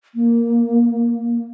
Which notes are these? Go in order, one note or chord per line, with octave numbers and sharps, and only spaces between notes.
A#3